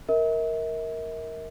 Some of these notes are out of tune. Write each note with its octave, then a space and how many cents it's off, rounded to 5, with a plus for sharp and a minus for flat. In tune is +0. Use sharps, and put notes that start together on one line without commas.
A#4 +0 E5 -45